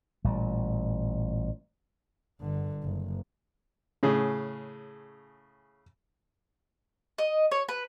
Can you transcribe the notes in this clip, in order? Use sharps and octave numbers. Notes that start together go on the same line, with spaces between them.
A1 A#2 G3
G1 D3
F#1
A2 C#3 G#4
D#5
C#5
B4